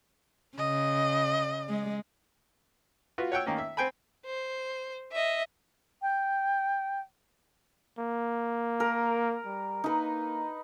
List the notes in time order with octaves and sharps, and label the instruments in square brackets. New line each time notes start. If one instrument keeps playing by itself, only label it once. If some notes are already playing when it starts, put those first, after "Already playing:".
[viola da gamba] C#3 [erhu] D#5
[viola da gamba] G#3
[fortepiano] F4 F#4 B4
C#5 F#5 G5 E6
D#3 A#3 C#4
E5
C4 C5 G5 G#5 B5
[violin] C5
D#5 E5
[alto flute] G5
[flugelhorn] A#3
[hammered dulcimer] A#4
[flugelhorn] G3
[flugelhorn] A#3 [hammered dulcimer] D#4 B4